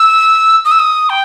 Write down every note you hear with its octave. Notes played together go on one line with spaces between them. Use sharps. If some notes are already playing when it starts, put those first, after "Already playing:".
Already playing: E6
D#6
E6
D#6
G5